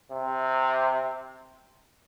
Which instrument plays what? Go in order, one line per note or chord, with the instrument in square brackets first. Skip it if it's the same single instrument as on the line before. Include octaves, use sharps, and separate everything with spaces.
[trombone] C3